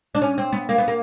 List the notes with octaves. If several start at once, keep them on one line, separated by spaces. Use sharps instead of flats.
D4
C#4
C4
B3
A#3
B3
A#3